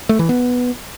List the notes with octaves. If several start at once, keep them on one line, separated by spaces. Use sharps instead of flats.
A3
E3
B3